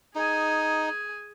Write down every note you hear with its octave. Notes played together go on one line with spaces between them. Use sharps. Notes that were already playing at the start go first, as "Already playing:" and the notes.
D#4 G#4 G#5